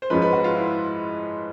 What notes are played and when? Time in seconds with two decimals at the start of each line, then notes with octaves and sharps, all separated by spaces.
0.02 C5
0.10 G#2 F3 G#3 C#4 F4 B4
0.22 B4
0.33 F#4
0.44 F4
0.55 E4